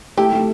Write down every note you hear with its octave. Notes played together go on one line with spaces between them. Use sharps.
A3 E4 G4
A3